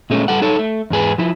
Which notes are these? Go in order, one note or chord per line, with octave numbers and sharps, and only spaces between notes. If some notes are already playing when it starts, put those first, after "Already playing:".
A#2 G#3 A3 C#4
G3 A4 F#5
D#4 A4 C#5
A3
E2 G#2 G#4 B4
F3 E4